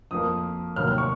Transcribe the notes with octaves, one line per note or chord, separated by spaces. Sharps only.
F2 F3 A#3 D#6
F1 D#2 D#3 F#3 A#3 F6
F6
C#6